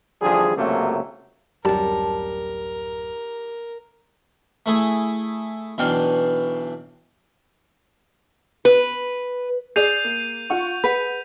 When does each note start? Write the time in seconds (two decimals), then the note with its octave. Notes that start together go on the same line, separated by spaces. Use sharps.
0.22 A1 D3 F3 G3 G#4
0.56 C#2 F#2 C3 F#3 A3 A#3
1.65 D1 F#2 G3 A#4 A5
4.66 A3 E4 G#4
5.78 B1 B2 E3 D4 F5 G5
8.65 B4
9.76 G#4 D5 G6 C7 D#7 F7
10.04 A#3
10.50 F4 F#5 C#6
10.84 G#4 B4 F#5